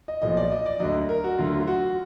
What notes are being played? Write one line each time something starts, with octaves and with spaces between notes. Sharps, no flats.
D#5
B1 A#2 F3 D#5
D5
D#5
D5
D2 D3 F#3 D#5
A#4
F#4
D2 D3 F#3 F4
F4
F#4